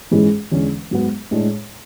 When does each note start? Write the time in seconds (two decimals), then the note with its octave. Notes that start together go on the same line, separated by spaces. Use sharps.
0.11 G#2 E3 G#3 C#4 G#4
0.52 E2 D3 G#3 C#4
0.91 G#2 F#3 B3
1.31 A2 G#3 D4